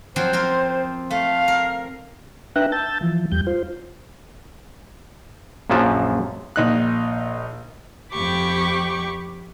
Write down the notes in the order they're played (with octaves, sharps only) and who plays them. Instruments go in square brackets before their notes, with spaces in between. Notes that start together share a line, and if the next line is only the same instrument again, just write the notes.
[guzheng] F3 F#3 C4 [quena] C5
[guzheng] C4 F4 A#4
[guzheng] A3 [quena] F5
[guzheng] A#4
[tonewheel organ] D4 B4 E5 G5 A#5 F#6
A5 E6 G6 A6
E3 F3
E2 G3 G6
F4 C5
[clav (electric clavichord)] A#1 F#2 F3 F#3 A5
[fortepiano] A#1 D#4 F#6
[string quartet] F2 G4 G5 B5 C#6 D6